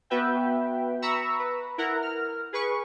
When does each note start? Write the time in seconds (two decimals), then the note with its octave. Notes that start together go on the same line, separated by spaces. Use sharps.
0.10 B3 F#4 B4 E5 G5
1.02 A#5 B5 C#6 E6
1.40 B4
1.78 E4 A#4 F#5 A#5
2.02 F6
2.53 G#4 B4 C#6